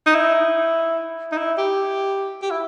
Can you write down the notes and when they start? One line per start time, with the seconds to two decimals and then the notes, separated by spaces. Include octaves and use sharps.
0.06 D#4
0.15 E4
1.32 D#4
1.38 E4
1.58 G4
2.42 G4
2.51 E4